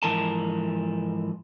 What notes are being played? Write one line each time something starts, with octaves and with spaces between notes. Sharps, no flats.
G#2 E3 F3 A#4 A5